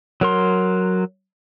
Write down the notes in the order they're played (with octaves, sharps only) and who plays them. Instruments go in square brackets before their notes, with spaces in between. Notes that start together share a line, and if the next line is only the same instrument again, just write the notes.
[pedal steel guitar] F#3 A#4 C6